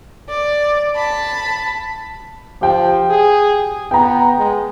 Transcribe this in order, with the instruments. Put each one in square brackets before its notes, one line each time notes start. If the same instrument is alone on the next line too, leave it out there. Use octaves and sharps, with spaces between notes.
[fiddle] D5
A5 B5
[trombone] F3 [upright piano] G4 G5
[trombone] G#4
[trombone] B3 [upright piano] G5 A#5
[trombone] G#3